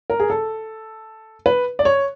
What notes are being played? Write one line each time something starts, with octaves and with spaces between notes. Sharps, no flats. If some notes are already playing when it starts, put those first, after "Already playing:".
A#4
G#4
A4
B4
D5
C#5